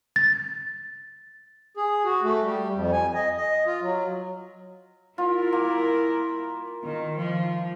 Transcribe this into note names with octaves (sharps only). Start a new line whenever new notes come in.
A6
G#4
F#4
A3
G3
F2
G#5
D#5
D#5
F4
F#3
E4 F4 A#4
A#3 G5 G#5
D#3
F3